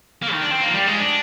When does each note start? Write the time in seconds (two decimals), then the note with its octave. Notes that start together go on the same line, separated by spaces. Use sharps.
0.22 A#3
0.32 D#3
0.42 D4
0.51 C4
0.60 A#3
0.67 F3
0.74 G3
0.87 G#3
0.99 D4